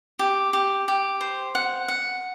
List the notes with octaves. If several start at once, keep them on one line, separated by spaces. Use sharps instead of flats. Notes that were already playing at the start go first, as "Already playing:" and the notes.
G4
G4
G4
C5
F#5
F#5